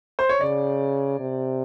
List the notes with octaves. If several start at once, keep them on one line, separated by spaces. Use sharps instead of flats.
C5
C#5
C#3 D5
C3